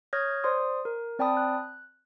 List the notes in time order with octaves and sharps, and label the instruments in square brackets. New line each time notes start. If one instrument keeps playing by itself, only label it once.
[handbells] C#5 D#6 F6 G6 G#6 A#6
C5 D5 C6 D#6
A#4
C4 D5 G5 A5 B5 D#6
F#6